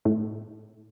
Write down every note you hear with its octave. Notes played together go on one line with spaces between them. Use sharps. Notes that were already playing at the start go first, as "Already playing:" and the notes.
A2